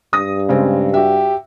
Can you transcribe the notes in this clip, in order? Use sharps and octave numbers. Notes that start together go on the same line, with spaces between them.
G2 D#6 A#6
C#3 G#3 C4
F#4 G4 E5